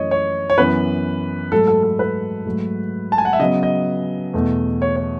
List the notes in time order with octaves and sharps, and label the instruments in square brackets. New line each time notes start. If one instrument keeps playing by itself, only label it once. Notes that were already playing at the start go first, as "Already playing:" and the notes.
Already playing: [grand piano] F#2 E3 A3 C#5 D#5
C#5
C#5
F#2 E3 B3 B4
G#2 F#3 A3 A4
A4
A4
B4
G#2 F#3 A3
A5
G#5
F#5
E5
C#3 F#3 B3 D#5
D#5
E2 B2 A3
C#5
C#5